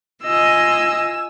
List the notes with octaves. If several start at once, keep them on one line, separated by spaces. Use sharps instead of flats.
F4 D#5 G#5 E6